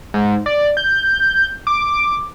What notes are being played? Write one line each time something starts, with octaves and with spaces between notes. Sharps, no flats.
G#2
D5
G6
D6